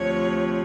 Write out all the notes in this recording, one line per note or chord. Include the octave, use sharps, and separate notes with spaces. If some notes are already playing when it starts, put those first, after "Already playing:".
Already playing: D2 C3 F3 C#5